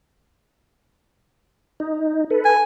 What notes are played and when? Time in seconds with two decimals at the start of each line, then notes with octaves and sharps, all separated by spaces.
1.80 D#4
2.30 A4 B4
2.45 G#5